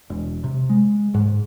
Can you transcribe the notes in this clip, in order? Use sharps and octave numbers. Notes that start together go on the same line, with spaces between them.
E1
C3
G#3
G#2